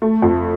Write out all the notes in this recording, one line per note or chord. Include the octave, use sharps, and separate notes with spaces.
A3
F2